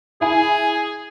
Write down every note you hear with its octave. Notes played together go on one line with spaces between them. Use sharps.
E4 G#4 G#5